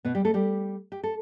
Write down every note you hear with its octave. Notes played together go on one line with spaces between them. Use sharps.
B2 B3
G3 G4
A3 A4
G3 G4
G4
A4